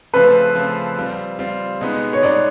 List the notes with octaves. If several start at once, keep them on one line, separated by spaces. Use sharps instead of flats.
C#3 F3 A3 C4 B4
C#3 F3 A3 C4
G3 C4 F4
G3 C4 F4
B2 G#3 B3 D#4
C#5
B2 G#3 B3 D#4 D5